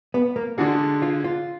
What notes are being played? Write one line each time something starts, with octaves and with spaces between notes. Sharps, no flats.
B3
A#3
D3 G#3 D4 F#4 G#4
F4
F4